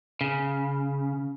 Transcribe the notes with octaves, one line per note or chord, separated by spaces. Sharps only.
C#3